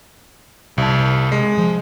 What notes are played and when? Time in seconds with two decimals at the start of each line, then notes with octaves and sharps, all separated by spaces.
0.78 C2 C3 A5
1.32 G#3
1.58 F3